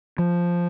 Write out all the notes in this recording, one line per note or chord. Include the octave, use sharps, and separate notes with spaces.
F3